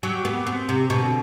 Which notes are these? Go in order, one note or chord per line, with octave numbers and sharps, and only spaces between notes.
F#3 G4
B3
B3 C4
C3
B2 D3